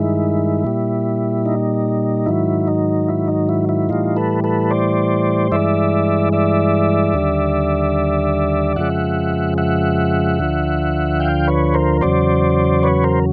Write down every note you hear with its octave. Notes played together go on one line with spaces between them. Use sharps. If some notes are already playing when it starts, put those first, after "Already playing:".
Already playing: G2 D#3 G#3 E4
A#2 G3
D#4
G#2 D#3 F#3 E4
D#4
E4
D#4
E4
E4
A2 E3 G3 D#4 F4
A4 B4
A4 B4
C5 D5
G2 E3 G#3 D5 E5
D5 E5
D#2 D3 G3
F2 C#3 F3 G#3 E5 F#5
E5 F#5
D2 D3 F3
F5 G5
B4 C#5
A#4 C5
E2 C#3 F#3 C5 D5
B4 C#5
A#4 C5